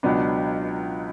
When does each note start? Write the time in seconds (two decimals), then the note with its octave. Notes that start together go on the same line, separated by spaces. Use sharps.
0.03 C#2 B2 F#3 B3 D4